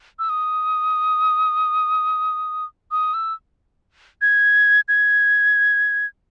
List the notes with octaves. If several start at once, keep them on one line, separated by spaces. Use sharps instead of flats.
E6
D#6
D#6
E6
G#6
G#6